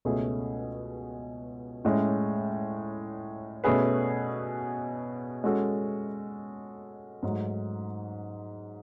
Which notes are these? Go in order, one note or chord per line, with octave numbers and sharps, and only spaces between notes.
C#2 B2 A3 C#4 G#4
A2 G#3 C#4
B2 A3 C#4 G#4 B4
G#3 C#4 F#4 A4
G#2 F#3 A3